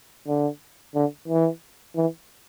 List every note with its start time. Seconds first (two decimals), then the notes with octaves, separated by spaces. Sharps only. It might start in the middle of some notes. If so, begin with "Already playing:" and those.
0.27 D3
0.95 D3
1.28 E3
1.96 E3